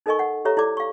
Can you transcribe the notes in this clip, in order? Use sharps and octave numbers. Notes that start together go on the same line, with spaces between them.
D#4 A4 A#4 D#5 G#5 C#6
F#5
G4 A4 C#5 E5 A#5
E4 A4 D5 D6
F5 C#6